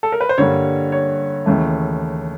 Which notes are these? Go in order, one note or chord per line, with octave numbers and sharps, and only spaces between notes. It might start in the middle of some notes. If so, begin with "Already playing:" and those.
A4
A#4
B4
C5
G2 D3 G3 A#3 C#5
C#5
D#2 C#3 E3 A3